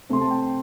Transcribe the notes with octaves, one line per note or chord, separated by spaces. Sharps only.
C3 A3 C4 C6
A5
G5